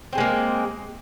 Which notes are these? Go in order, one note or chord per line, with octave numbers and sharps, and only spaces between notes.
G#3 A#3 C4 G#4